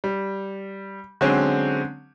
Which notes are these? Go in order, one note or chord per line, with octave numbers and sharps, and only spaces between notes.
G3
D3 F#3 G#3 C4 C#4